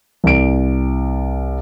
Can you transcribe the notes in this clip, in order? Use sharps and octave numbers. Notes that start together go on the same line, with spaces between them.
C2 D7